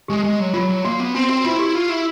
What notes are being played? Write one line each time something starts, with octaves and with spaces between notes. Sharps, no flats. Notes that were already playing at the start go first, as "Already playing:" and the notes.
G#3 G4
G#3 G4
F#3
F#3 F4
F#3
A#3 F#4
B3
C4 F#4
F#4
E4 F4
G4
F4
E4